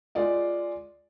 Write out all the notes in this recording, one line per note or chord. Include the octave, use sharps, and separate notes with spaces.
G#3 F4 D5 D#5